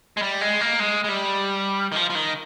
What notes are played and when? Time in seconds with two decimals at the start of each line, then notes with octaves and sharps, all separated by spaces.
0.17 G#3
0.22 G3
0.41 G#3
0.61 A#3
0.80 G#3
1.04 G#3
1.08 G3
1.92 D#3
1.96 F3
2.10 F3
2.15 D#3